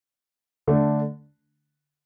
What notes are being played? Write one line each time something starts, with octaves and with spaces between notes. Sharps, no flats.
D3 A3 D4